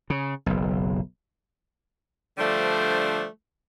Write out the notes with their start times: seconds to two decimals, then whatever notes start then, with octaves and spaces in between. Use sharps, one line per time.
0.10 C#3
0.46 F#1 B1
2.38 D3 F3 G3 A3 D4 C5